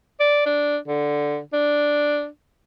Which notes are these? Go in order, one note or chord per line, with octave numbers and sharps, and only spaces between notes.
D5
D4
D3
D4